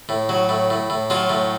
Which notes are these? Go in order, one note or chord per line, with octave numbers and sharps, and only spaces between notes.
A2
F#3
A2
A2
A2
F#3 F4
A2